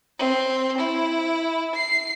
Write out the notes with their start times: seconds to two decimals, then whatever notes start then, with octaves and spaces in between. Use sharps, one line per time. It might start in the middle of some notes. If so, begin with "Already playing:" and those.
0.18 C4
0.78 E4
1.75 C7